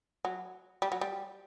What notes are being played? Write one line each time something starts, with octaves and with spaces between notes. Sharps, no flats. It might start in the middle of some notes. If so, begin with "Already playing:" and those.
F#3
G3
F#3
G3